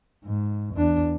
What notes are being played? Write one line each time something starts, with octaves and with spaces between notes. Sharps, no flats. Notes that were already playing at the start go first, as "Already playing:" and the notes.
G#2
E2 D4